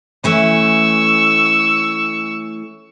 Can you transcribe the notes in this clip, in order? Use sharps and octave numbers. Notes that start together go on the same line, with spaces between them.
E3 A3 C#4 C#6 E6